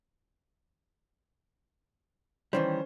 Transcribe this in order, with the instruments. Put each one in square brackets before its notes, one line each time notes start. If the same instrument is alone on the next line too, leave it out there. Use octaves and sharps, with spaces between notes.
[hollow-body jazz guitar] D#3 E3 G3 [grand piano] C#4 C5